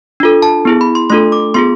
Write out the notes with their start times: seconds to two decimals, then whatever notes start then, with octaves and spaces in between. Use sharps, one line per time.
0.20 D4 F4 A4
0.42 A5
0.65 B3 E4 G#4
0.81 B5
0.95 C6
1.10 A3 D4 F4 A4 C6
1.32 D6
1.54 B3 F4 G#4 C6